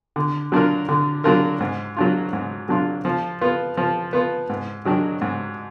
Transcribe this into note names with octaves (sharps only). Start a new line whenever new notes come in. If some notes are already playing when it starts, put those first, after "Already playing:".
D3
F#3 D4 F4 A#4
D3
F#3 D4 F4 A#4
G#2
F#3 D4 F4
G#2
F#3 D4 F4
F3
B3 F4
F3
B3 F4
G#2
D#3 F#3 D4
G#2